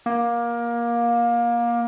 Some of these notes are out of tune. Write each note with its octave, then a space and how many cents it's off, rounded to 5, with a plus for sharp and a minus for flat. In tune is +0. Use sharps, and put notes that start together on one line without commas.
A#3 +20